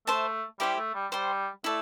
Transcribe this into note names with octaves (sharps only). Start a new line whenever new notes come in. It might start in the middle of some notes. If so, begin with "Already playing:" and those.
A3 C5 E5 A5
G3 E4 G4 C5 E5
A3
G3
G3 C5 G5 C6
A3 E4 A4 D5